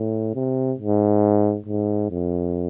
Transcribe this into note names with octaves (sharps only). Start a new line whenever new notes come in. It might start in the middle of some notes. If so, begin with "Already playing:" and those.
Already playing: A2
C3
G#2
G#2
F2